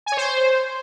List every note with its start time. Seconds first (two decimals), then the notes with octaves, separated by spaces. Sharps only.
0.06 G#5
0.12 C#5
0.17 C5